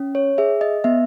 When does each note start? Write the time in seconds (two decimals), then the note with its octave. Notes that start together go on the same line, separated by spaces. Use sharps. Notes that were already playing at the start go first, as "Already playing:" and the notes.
Already playing: C#4
0.15 C#5
0.38 G#4 E5
0.61 D#5
0.84 B3 E5